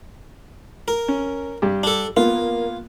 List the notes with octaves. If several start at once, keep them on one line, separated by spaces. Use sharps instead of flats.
A#4
C#4
G2 G4
D4 A4
A#3 B3 F4